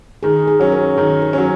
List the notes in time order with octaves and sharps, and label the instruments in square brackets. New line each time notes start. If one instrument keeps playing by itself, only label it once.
[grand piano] D#3 [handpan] G#4
[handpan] G#4
[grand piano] F#3 C#4
[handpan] A#4
[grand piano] D#3 [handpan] G#4
[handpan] A#4
[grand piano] F#3 C#4